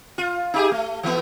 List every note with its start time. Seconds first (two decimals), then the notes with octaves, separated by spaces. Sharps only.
0.18 F4
0.54 D#4 G4 G#4
0.71 A3
1.03 E3 A3 B3